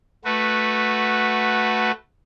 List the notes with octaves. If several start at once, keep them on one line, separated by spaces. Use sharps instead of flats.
A3 F#4 B4